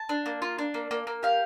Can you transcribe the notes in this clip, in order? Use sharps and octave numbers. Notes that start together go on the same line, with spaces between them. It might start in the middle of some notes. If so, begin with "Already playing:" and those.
Already playing: A5
D4
A#3
F4
D4
A#3
A#3
A#3
G4 F5